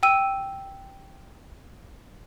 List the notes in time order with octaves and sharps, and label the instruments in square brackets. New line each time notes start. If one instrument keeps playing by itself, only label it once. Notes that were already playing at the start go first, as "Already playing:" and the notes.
[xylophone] G5 E6 D#7